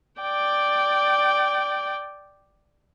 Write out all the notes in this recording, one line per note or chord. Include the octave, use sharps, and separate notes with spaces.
D5 G5